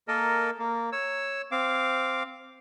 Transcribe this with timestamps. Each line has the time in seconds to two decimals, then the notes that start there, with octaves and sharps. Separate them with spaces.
0.08 A#3 A4 A#4 D#5
0.59 A#3
0.92 C#5 E6
1.52 C4 F5 D6